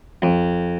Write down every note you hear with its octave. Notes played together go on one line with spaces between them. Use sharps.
F2